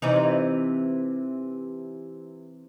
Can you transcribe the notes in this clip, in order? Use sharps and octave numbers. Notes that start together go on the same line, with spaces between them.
C3 E3 D#4